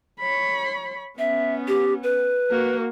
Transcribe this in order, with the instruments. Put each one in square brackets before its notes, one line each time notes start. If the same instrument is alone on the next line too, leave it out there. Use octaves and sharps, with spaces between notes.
[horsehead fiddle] C#5 B5
[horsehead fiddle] B3 C#4 [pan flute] E5
[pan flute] G4
B4
[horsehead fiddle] A#3 F#4